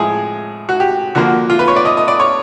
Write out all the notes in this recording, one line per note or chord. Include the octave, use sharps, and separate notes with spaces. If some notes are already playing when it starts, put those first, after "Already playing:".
Already playing: A2 F3 G#3 G#4
F#4
G4
D3 F3 A#3 F#4
F4
B4
C#5
D5
D#5
D#5
D5
C#5